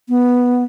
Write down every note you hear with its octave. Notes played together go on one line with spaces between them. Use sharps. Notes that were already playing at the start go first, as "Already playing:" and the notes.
B3